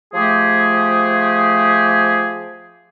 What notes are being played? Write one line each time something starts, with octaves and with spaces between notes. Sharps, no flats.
F3 A3 G4 G#4